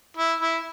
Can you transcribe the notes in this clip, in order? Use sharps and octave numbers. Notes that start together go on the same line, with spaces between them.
E4
E4